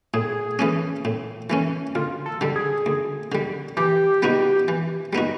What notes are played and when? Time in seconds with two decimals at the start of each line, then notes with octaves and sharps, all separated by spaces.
0.14 A2 G#4
0.59 E3 A3 C#4
1.05 A2
1.50 E3 A3 C#4
1.95 D2 F4
2.26 A4
2.41 D3 G3
2.56 G#4
2.86 D2
3.32 D3 G3
3.77 E3 G4
4.22 G3 B3 D#4 F#4
4.68 E3
5.13 G3 B3 D#4 F#4